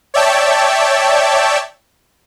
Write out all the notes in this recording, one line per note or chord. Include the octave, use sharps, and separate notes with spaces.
C#5 D5 E5 G5 A5